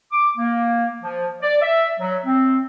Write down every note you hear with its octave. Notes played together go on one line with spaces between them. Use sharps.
D6
A#3
F3
D5
E5
F#3
C4